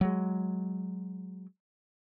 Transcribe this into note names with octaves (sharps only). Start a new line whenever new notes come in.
F#3 G#3